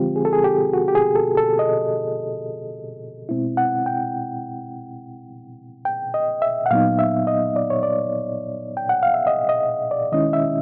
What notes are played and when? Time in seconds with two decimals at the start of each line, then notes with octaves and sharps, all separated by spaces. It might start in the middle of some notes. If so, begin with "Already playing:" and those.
Already playing: D3 F3 G#3 C4 F4 G4
0.16 G#4
0.25 A4
0.33 G#4
0.44 G4
0.73 F#4
0.88 G4
0.95 G#4
1.16 A4
1.37 A4
1.59 D#5
3.29 B2 G#3 C4 E4
3.57 F#5
3.86 G5
5.85 G5
6.14 D#5
6.42 E5
6.66 F#5
6.71 A#2 F#3 B3 D#4 F5
6.99 E5
7.27 D#5
7.56 D5
7.70 C#5
7.83 D5
8.77 G5
8.89 F#5
9.03 F5
9.14 E5
9.27 D#5
9.49 D#5
9.91 D5
10.12 D#3 G#3 C#4 E4 D#5
10.33 E5